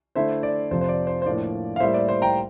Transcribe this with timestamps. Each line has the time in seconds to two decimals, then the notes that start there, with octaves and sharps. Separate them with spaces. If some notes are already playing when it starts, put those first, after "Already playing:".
0.15 D3 A3 E4 C5 E5
0.43 D5
0.71 F2 C3 F3 C5
0.81 C5
0.89 D5
1.07 C5
1.22 C5
1.26 A2 F3 A#3 D4 D5
1.76 F5
1.80 A2 G3 A#3 C5 E5
1.94 D5
2.09 C5
2.22 G5 A#5